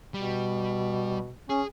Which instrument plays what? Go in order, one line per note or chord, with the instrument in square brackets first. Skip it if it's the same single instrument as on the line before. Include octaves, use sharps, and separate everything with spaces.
[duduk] B2 [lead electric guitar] G3
[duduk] C#4 [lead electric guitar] G#4